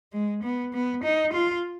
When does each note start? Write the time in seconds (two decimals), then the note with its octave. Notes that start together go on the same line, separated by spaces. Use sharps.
0.13 G#3
0.43 B3
0.73 B3
1.04 D#4
1.33 F4